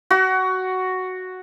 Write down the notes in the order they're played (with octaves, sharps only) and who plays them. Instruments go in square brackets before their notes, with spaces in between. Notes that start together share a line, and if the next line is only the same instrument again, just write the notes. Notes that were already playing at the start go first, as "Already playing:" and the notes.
[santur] F#4